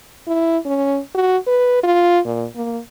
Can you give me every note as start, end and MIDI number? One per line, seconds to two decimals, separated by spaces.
0.27 0.58 64
0.66 0.98 61
1.15 1.37 66
1.47 1.82 71
1.83 2.19 65
2.25 2.46 46
2.56 2.79 58